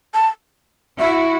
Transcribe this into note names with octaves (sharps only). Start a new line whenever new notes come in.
A5
E4 F#4 E5